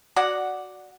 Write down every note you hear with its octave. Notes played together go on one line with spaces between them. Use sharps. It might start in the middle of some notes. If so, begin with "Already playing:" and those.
F#4 D5 F#5